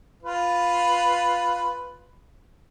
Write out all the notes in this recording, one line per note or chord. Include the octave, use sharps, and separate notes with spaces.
F4 B4